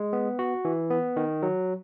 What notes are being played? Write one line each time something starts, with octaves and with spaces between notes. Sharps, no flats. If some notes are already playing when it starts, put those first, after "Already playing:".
Already playing: G#3
B3
F#4
E3
B3
D#3
F#3